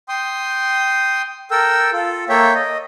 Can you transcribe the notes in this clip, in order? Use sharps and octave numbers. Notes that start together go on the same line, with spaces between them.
G5 C6 D#6
A4 A#4 G5 E6
F4 A4
A#3 A4 C#5 E5 G5
D#5